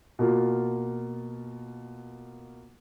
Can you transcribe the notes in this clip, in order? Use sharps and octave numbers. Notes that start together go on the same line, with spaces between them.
B2 A#3 F4